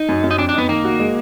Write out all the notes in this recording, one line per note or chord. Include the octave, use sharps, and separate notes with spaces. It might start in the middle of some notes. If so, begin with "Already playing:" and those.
Already playing: D#4
F#2
F#2
D#4
F2 D4
D4
B3 D#4
D#3 A#3
F#4
G#3